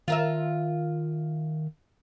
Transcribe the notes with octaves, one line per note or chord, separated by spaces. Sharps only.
D#3 F4 A#4 E5